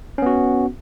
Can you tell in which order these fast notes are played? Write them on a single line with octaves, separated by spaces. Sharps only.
C#4 B3 F#4